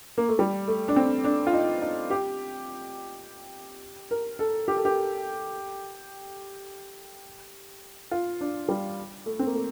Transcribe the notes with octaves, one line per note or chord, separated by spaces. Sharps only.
A#3
A3
G3
A3
D4
C4
D4
F4
D#4
D#4
G4
A#4
A4
G4
A4
G4
F4
D4
G3
A3
C4
A#3
A3